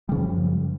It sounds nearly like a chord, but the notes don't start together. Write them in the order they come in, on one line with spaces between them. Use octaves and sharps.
G3 C#3 F3 F#2